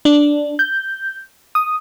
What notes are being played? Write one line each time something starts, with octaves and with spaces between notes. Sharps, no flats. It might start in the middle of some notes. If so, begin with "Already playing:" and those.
D4
G6
D#6